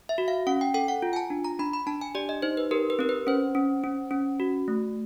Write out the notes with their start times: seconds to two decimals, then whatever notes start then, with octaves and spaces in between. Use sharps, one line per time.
0.09 E5
0.18 F#4
0.28 F5
0.47 C#4 F#5
0.61 G5
0.74 A4 G5
0.88 F#5
1.02 F4
1.13 G#5
1.16 A5
1.30 D4
1.45 A#5
1.59 D4 B5
1.73 B5
1.87 D4 A5
2.01 G#5
2.15 G4 D5
2.29 D#5
2.42 D#4 C5
2.57 B4
2.71 G4 A#4
2.90 B4
2.99 C4 A#4
3.09 B4
3.27 C#4 C5
3.55 C#4
3.84 C#4
4.11 C#4
4.40 F#4
4.68 A3